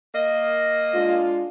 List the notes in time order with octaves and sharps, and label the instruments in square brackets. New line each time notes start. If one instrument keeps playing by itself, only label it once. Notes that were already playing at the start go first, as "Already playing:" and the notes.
[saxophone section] A#3 D#5
[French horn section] G#3 D4 F4